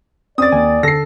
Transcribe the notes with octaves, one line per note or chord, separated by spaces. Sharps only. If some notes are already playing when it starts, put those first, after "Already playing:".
C4 C#4 D5 D#6 A6
D#2 G#5
D3 A4 A#6 C7